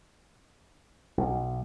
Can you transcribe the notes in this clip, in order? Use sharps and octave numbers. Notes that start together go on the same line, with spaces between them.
B1